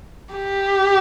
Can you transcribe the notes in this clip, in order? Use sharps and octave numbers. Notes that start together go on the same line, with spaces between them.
G4